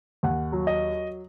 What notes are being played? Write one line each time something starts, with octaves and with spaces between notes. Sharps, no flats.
D#2 F#5
F#3
D#5